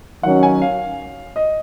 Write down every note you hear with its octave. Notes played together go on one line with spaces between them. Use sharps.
D#3 F#3 C#4 F#5
G#5
F5
D#5